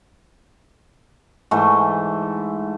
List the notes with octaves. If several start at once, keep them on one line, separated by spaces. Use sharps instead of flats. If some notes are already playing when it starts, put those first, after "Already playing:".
G#2 E3 A3